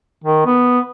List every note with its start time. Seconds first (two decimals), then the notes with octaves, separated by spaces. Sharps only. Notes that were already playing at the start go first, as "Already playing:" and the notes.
0.24 D#3
0.46 B3